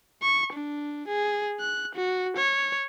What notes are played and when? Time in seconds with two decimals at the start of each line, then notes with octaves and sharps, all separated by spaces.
0.22 C#6
0.53 D4
1.07 G#4
1.60 F#6
1.95 F#4
2.37 C#5